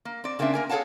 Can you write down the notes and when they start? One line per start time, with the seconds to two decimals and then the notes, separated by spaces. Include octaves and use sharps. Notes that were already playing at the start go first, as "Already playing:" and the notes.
0.05 A#3
0.24 C4 D5
0.39 C#3 A#3 C4 D4 E5
0.53 A#3 A#4 G#5
0.69 G#4 A4 C#5 F5 F#5 A5